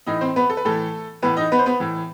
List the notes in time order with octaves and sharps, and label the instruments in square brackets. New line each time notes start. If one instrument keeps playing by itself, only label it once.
[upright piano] A2 E3 D#4 D#5
C4 C5
B3 B4
A4
B4
A2 E3 A3 A4
A2 E3 B3 B4
D#4 D#5
B3 B4
C5
B3 B4
A2 E3